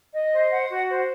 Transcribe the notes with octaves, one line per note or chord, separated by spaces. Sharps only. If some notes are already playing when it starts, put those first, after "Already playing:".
D#5
C5
F#5
F#4
C5